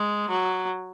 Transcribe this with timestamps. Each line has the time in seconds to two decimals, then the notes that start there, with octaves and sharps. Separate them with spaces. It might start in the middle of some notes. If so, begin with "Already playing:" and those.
Already playing: G#3
0.29 F#3